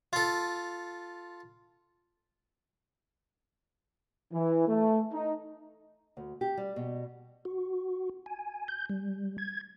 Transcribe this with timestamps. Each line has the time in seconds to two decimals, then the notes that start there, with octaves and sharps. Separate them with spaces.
0.13 F4 A4
4.33 E3
4.68 A3
5.13 D#4
6.17 D2
6.41 G4
6.57 G3
6.76 B2
7.45 F#4
8.26 G#5
8.68 G6
8.89 G3
9.38 G#6